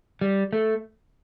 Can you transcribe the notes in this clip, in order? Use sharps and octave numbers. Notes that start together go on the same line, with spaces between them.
G3
A3